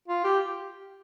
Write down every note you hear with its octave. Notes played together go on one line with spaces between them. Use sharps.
F4
G4